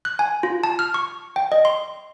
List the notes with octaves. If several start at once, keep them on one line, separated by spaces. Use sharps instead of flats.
F#6
G#5
F4
A5
F6
C#6
G5
D#5
C6